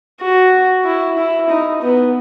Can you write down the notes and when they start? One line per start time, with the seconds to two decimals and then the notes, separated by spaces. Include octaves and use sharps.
0.21 F#4
0.85 E4
1.18 E4
1.49 D#4
1.82 B3